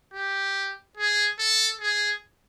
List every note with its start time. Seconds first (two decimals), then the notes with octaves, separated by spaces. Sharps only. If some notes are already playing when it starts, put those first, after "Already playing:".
0.14 G4
0.97 G#4
1.39 A4
1.81 G#4